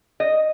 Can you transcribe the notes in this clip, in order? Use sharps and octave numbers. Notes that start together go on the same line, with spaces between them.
D#5